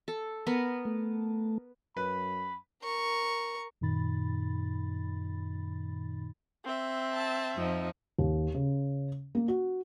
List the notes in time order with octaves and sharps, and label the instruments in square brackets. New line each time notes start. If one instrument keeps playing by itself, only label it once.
[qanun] A4
B3 A#4
[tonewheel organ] A3
[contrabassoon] F#2 [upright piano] B4 [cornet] B5
[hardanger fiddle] A#4 C#6
[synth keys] F#2 A#2 D#3 D#4 B5 A6
[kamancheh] C4 E5
[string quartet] A5
F2 F3 D#4
[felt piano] D#2
C#3
A#3
F#4